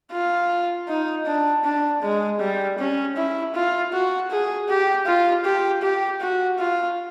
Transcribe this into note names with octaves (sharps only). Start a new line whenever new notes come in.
F4
D#4
D4
D4
G#3
G3
C#4
E4
F4
F#4
G#4
G4
F4
G4
G4
F#4
F4